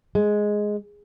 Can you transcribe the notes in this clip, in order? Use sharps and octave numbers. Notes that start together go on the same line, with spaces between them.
G#3